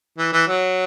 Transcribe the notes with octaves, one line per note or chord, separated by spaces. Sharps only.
E3
E3
F#3